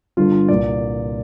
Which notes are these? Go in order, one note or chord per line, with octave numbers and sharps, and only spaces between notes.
G1 G2 D3 F4
C2 A#2 D5